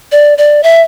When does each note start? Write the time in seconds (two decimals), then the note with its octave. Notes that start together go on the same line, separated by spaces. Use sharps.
0.12 D5
0.38 D5
0.63 E5